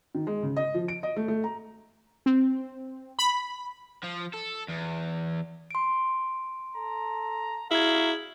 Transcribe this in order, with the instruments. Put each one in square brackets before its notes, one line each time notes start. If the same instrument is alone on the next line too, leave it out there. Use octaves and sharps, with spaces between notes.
[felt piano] D#3
G#3
C#3
D#5
F3
D7
D#5
A3
A3
A#5
[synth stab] C4
B5
[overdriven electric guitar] F3
A4
E2
[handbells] C6 D7
[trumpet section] A4 A#5
[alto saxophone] E4 [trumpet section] F#4 F5 A#5 [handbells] G#4 G#6